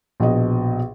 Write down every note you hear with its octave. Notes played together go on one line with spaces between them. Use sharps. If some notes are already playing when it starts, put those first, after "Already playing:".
A#1 B2 D#5